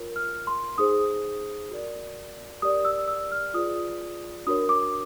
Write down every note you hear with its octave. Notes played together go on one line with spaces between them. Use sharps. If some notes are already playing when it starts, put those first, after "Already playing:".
Already playing: F4 A#4 C#5
F6
C6
D#4 G#4 C5 D#6
F#4 A#4 D5
G4 A#4 D5 D#6
E6
E6
F6
F4 G#4 B4 D5 D#6
D4 F#4 A#4 C#5 D#6
D6